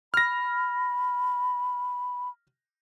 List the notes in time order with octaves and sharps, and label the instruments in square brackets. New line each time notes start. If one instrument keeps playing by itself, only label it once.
[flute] B5 [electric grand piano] F6 A#6